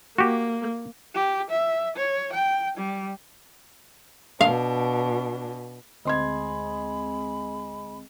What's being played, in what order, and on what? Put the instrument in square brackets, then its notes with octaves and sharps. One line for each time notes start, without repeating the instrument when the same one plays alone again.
[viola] A#3 [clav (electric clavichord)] F#4 G4
[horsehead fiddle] G4
E5
C#5
G5
G3
[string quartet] B2 D4 [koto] F5
[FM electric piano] D2 C4 [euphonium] G#3 [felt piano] D#5 C6 G#6 [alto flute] B5